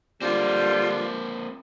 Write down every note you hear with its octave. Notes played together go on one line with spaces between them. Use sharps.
D3 G3 A#3 C4 F4